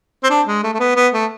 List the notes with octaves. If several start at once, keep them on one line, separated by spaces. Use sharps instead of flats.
C4
D4
G#3
A3
A3
B3
B3
A3